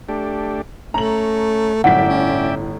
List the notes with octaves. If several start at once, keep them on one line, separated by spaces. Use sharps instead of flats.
A3 D4 G4
A3 C#4 A#5 F#7
G1 F#2 A2 D5 E5 F#5 G5 B6
C#4